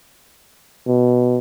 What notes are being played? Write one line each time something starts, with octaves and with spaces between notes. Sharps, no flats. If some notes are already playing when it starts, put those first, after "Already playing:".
B2